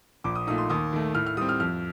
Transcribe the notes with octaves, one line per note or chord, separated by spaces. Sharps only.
A#1 D6
D#6
A#2 A3 D#4 D#6
C6
D#2 D#6
D#3 A3
A2 F6
F6
G3 C4 D#6
F6
F2 F6